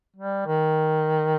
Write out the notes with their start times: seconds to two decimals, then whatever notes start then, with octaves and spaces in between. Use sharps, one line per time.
0.16 G3
0.47 D#3